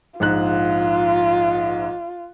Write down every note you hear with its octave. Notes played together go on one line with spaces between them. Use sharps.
A#1 G#2 F4 F#6